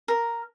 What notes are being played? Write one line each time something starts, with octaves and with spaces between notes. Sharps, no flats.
A#4